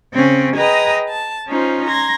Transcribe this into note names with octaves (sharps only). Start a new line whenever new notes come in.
C#3 C4 C#4
G#4 B4 D#5 G5 A#5 D#6
A5
C#4 D#4 F4 C5
A#5 C6 G#6 A#6